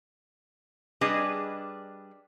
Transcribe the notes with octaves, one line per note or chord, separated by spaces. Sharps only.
G3 D4 G#4 B4 D#5